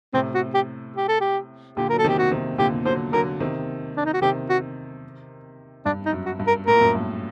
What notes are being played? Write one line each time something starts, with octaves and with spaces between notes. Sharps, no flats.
A2 C3 C4
F#4
G4
G4
A4
G4
A#2 D3 G4
F#3 A#4
A4
C3 D#3 G4
F#4
C3 D#3
A#2 D3 G4
D3 F#3 C5
D3 F#3 A#4
C3 D#3
D4
D#4
F#4
C3 D#3 G4
F#4
G2 D4
D#4
F#2
F#4
G2
A#4
A2 A#4
A#2
F#2 A2
G2